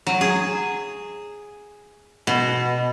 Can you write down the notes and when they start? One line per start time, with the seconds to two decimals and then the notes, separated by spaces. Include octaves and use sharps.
0.07 F#3
0.21 G#4
2.27 B2